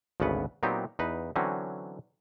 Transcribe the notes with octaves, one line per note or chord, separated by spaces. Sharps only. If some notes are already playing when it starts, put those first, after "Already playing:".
G#1 D2 C#3 B3 B4 F#5
A#2 F#3 B3 C4 D#4 G4
E2 D#4 B4
D3 E3 F#3 C4 C#4